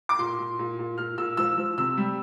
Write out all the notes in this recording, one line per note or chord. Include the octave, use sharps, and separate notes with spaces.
D6
A#2 C6
A#2
A#2
A#2
A#2 F6
A#2 E6
F3 E6
F3
C3 E6
G3